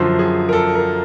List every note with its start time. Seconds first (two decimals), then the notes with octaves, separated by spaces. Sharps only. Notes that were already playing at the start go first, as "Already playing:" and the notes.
Already playing: F#2 D3 F3 C5
0.19 G#4
0.49 A#4
0.53 A4
0.75 A#4